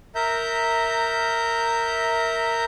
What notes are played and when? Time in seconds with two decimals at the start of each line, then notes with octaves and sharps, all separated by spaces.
0.15 A#4 E5 A#5 G6